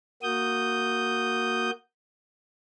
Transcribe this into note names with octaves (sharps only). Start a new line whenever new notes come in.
A#3 F#4 D#6 G6